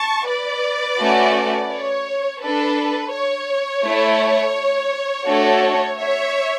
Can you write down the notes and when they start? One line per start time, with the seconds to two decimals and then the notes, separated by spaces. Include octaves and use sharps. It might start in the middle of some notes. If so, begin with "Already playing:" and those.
Already playing: A5 C#6
0.29 B4 D5
1.00 A3 C#4 F#4 A4
1.71 C#5
2.42 D4 A4 B4
3.13 C#5
3.84 A3 E4 A4
5.26 A3 D4 F#4 A4
5.98 C#5 E5